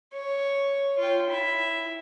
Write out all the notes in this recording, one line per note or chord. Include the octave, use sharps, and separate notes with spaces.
C#5
F4 G5
E4 E5